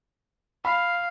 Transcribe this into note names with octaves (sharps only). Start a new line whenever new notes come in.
F5 B5